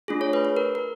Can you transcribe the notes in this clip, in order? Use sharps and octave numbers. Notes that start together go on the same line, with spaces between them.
A3 D4 F4 G#4
C#5
B4
B4
A#4
A#4